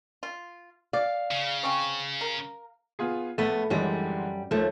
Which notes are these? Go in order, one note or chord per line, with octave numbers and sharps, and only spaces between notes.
F4
D5 F5
C#3
C4 C#4 C#5
A#4
B3 F4 G#4
A#1 A3 B3
F#2 D3 E3 G3 G#3
D#2 F3 A3